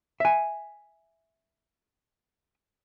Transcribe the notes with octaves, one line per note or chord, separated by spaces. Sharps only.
E5 G#5